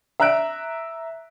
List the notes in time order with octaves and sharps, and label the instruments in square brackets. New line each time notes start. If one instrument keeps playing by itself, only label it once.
[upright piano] E5 A#5 E6 F#6 D7